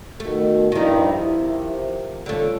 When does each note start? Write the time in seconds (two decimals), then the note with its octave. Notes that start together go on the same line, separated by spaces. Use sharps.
0.20 B2 D#3 A3
0.72 G2 D#3 F3 G3 D#4 E4
1.32 C3
2.26 D3 G3 A3 C#4 F4